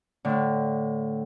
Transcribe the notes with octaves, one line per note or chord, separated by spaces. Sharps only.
A2 D3